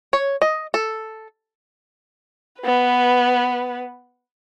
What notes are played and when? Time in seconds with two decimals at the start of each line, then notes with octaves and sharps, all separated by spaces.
0.13 C#5
0.42 D#5
0.74 A4
2.62 B3 B4